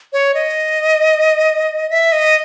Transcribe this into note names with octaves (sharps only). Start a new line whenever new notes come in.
C#5
D#5
E5
D#5